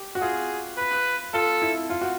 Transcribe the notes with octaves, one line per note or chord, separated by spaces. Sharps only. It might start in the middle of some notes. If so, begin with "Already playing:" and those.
Already playing: G4
F#4
F4 G#4
B4
F4 A4
E4
F4
F#4